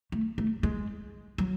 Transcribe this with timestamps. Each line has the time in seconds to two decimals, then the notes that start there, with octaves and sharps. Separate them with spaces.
0.12 A3
0.38 A3
0.63 G#3
1.38 F#3